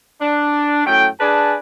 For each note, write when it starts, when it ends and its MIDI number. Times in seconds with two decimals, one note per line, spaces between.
0.21 0.84 62
0.86 1.06 42
0.86 1.06 45
0.86 1.06 57
0.86 1.06 79
1.20 1.56 62
1.20 1.56 68
1.20 1.56 71
1.20 1.56 74
1.20 1.56 80
1.20 1.56 81